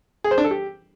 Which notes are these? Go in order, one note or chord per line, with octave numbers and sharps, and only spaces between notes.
G#4
C5
D4
A4
G4